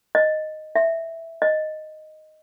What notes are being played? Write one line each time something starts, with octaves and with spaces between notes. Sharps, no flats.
D#5
E5
D#5